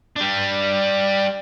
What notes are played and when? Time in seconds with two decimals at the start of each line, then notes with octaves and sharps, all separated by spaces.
0.16 G3 D4